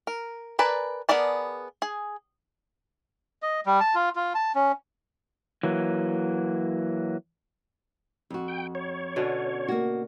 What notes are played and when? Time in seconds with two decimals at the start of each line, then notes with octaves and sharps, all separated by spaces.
0.07 A#4
0.59 A#4 B4 D5 G#5 A5
1.09 B3 G#4 A#4 D5 A5
1.82 G#4
3.42 D#5
3.66 G3
3.80 A5
3.95 F4
4.16 F4
4.35 A5
4.55 C#4
5.63 E3 F#3 A#3
8.30 F2 F#4
8.48 G5
8.75 C#5
9.16 B2 D3 C#4
9.68 A#3 F#4